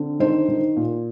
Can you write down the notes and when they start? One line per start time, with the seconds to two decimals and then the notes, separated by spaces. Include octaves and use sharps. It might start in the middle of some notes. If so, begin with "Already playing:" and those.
Already playing: D3 C4
0.20 D#3 C5
0.48 D#3
0.76 A#2